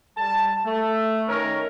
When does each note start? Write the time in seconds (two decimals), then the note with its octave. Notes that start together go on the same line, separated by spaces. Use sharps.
0.16 G3 A5
0.66 A3
1.28 D#3 C#4 A#4